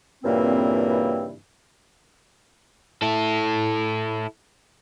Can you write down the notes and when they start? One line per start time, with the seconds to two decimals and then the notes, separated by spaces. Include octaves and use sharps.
0.24 G2 A#2 C#3 E3 A#3 C4
3.02 E4 A4